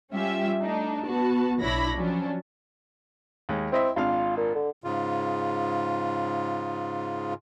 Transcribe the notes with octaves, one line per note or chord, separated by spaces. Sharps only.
G3 C#4 F4 G4 E5
A3 D4 D#4
B3 F#4 A5
B1 D4 E4 C#5 B5 A#6
F3 F#3 C#4 D4
D#2 G#3
C4 E4 D#5 E5
G#1 D4 F4 F5
A#2
D3
G#2 C#3 F4